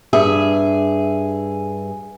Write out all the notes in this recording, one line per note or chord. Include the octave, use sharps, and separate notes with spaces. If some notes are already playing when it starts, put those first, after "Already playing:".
G2 G#4 E5